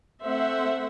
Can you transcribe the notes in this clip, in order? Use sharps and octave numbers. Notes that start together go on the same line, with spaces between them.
A3 C4 C5 E5 F#5